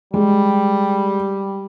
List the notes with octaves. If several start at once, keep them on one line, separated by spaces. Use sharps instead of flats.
G3 G#3